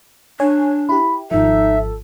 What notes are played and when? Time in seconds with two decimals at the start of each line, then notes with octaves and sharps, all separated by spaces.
0.40 D4 C#5 G#5
0.89 E4 G4 B5
1.31 G#1 F3 D#4 A4 E5